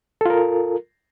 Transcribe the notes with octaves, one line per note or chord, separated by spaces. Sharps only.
F4 A4 A#4